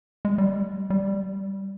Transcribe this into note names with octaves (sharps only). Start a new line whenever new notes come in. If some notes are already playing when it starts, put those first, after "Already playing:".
G#3
G3
G3